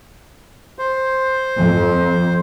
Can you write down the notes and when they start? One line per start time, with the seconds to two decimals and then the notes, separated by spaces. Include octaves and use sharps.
0.79 C5
1.57 F2